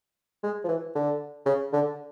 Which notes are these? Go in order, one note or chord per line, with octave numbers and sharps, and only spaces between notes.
G#3
F3
E3
D3
C#3
D3